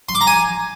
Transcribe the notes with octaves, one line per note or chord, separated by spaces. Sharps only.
C6
D6
A#5
G#5